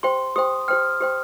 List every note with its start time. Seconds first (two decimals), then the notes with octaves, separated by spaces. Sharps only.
0.03 G4 C5 G5 C6
0.36 G4 C5 G5 D#6
0.68 G4 C5 G5 F6
1.01 G4 C5 G5